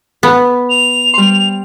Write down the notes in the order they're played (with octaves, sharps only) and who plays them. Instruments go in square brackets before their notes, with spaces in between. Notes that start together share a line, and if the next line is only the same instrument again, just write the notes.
[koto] B3
[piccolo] F7
[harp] G3 C6